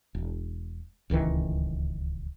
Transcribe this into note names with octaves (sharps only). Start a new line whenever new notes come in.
E1
D1 C#2 D#3 E3